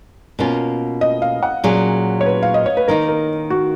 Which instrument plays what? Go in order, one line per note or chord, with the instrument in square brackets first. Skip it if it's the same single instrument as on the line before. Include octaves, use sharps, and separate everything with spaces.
[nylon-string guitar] B2 A#3 C#4 F4
[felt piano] D#5
F5
F#5
[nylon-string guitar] A#2 F#3 C#4 G#4
[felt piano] C#5
B4
F5
D#5
C#5
B4
[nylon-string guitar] D#3 A#3 D#4 [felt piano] A#4
[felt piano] A#4
F#4